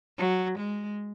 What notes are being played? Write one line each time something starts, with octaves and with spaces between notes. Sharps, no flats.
F#3
G#3